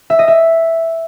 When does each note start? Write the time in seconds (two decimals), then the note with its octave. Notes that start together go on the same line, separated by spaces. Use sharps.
0.10 E5
0.19 D#5
0.28 E5